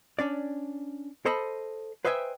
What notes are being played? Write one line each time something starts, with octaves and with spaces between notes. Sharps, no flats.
C#4 D4 D5
A4 C5 D#5 A5 B5
B4 C5 D#5 E5 G5 G#5